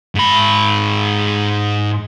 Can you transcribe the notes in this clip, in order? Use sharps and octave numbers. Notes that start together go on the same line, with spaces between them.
G#2 B5